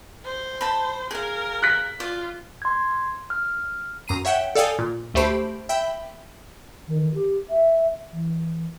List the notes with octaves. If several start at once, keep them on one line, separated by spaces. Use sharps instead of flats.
C5
A5 B5
G#4 A#4 F5
F#6 B6
F4 D5
C6 G#6
F6
F#2 A#5 C7 D#7
C#5 E5 F#5 G5
A4 D5 F5 G5 G#5 D#6
A#2
D2 A3 G4 C5 B5 D7
E5 G5 B5
D#3
D#3
G4
E5
E3